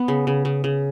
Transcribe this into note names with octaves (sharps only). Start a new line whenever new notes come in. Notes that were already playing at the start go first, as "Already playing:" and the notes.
Already playing: B3
C#3
C#3
C#3
C#3